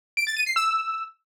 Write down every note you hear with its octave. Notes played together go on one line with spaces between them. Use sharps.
D7
A6
D#7
C7
E6